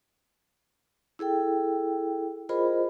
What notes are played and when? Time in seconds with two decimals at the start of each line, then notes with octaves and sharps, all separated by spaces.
1.19 E4 G#4 A4 G5
2.49 F4 G#4 A#4 C5 D#5 B5